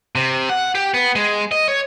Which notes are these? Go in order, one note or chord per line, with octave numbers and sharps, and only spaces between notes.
C3
F#5
G4
B3
G#3
D#5
C#5